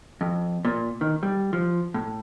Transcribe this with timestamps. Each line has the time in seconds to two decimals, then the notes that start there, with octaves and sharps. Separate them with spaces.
0.21 F2
0.65 A#2
1.01 D#3
1.23 G3
1.53 F3
1.94 A2